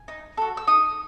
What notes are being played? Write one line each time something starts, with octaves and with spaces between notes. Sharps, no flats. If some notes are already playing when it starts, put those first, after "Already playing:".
Already playing: G#5
D#4
F#4 A4
E6
D#4 D#6